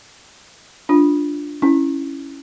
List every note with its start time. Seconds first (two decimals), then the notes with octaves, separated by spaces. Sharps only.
0.89 D4 F4
1.62 C#4 E4